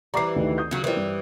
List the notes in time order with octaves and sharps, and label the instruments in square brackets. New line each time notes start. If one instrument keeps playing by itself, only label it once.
[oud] E3 G3 [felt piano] A#5 D6 C7
[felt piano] D2 D#3
D#6 G6
[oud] C#3 F#3
[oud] E3 G3 [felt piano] E4 A#4 C5
[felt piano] G2